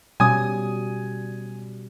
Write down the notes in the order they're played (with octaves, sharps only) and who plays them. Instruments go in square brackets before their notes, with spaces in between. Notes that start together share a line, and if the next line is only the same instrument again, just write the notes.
[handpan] B2 G3 C#4 [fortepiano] G#5 D#6